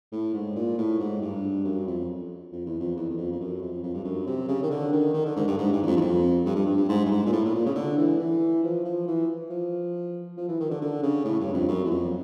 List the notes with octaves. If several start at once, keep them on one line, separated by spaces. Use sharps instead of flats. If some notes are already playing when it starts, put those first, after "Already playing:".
A2
G#2
A#2
A2
G#2
G2
F#2
F2
F2
E2
F2
E2
E2
F2
F2
F#2
F2
F2
G2
F#2
C3
C#3
D#3
D3
D#3
D#3
D3
G#2
G2
G#2
G2
E2
F2
E2
F2
G2
G2
G2
G2
G#2
G2
G#2
A#2
A2
A2
A#2
C#3
D3
E3
E3
F3
F3
E3
F3
F3
E3
D#3
D3
D3
C#3
A2
G2
F2
F#2
E2
F2